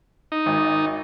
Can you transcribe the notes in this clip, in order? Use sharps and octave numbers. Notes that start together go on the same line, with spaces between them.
D#4
G#1